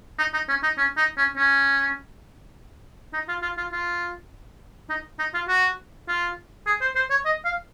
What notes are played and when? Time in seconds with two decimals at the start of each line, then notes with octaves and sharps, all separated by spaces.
0.19 D#4
0.34 D#4
0.49 C#4
0.63 D#4
0.78 C#4
0.97 D#4
1.17 C#4
1.37 C#4
3.13 D#4
3.28 F4
3.43 F4
3.57 F4
3.72 F4
4.90 D#4
5.19 D#4
5.34 F4
5.48 F#4
6.08 F4
6.67 G#4
6.81 C5
6.96 C5
7.10 C#5
7.25 D#5
7.45 F5